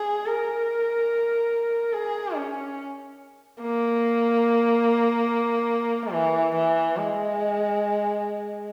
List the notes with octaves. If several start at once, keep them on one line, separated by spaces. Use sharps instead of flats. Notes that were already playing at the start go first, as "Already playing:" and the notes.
Already playing: G#4
A#4
G#4
C#4
A#3
E3
E3
G#3